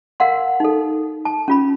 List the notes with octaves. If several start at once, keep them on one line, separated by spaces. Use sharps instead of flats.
A#4 F5 F#5 C6
D#4 A4
A5
C#4 F4 B5